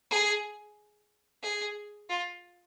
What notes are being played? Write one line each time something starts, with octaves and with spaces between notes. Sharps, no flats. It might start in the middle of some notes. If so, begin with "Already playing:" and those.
G#4
G#4
F4